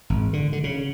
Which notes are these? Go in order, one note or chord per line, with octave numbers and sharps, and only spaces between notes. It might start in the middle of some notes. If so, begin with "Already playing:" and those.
G#1
D3
D3
C#3